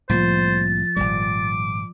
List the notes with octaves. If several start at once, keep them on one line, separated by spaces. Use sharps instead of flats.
C2 A2 F3 A#3 F4 C5 A6
G#1 A#2 G3 D5 D6